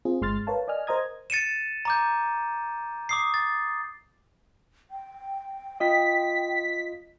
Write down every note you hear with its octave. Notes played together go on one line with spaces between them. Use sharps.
C4 F4 G#4
G1 G#3 C6 F6 A6
A#4 B4 C#5 F5 A5
D5 D#5 G#5 F6
A#4 C5 D#5 A#5 D#6 G#6
A6 C#7 D#7 E7
A#5 D6 G6
D6 D#6 C7
A6
G5
F4 D#5 B6